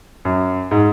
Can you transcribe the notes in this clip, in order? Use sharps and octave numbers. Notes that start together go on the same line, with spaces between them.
F#2
G#2